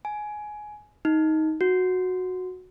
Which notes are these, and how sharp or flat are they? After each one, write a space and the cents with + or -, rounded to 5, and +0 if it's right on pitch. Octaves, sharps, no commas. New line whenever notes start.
G#5 +15
D#4 +15
F#4 -10